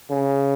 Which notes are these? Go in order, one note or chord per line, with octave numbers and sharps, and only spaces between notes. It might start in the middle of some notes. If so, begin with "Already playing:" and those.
C#3